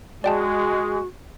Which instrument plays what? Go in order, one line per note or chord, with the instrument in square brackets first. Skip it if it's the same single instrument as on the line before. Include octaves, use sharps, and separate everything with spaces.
[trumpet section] G#3 [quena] F#4 [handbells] D5 G5 A5